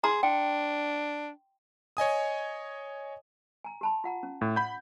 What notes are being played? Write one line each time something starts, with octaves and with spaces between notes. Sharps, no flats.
G#4 A#5 C6
D4 G5
C#5 D#5 G#5 D#6
G#5 A#5
G4 A5 B5
F4 F#5 A#5
C#4
A2
F#5 B5 G6